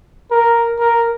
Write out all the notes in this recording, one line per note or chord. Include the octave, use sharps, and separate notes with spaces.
A#4
A#4